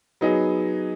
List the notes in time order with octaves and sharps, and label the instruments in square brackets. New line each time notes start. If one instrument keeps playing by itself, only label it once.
[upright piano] F#3 B3 D#4 G#4